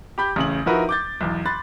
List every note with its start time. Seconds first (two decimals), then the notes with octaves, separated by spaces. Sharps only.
0.18 G4 B5 G6
0.36 A1 C#3 F#7
0.66 F3 D#4 E4 F#4 A#4 B4
0.89 D6 G6 A6
1.21 B1 E2
1.45 B5 C6 F#6 A6